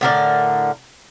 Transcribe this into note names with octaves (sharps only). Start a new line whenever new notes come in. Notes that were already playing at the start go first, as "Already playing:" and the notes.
A2 D3 A#4 D5